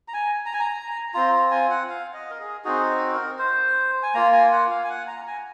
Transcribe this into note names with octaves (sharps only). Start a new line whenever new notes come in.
A#5
G#5
A#5
G#5
A#5
C4 F4 A#5
A#5
G#5
F#5
F5
D#5
A#4
G#4
C4 D#4 F#4 G#4
A#4
C5
G#5
A#3 F4 A#5
G#5
F#5
F5
G#5
F#5
A#5
G#5